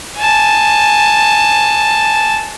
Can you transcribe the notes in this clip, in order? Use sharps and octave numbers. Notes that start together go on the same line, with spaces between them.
G#5 A5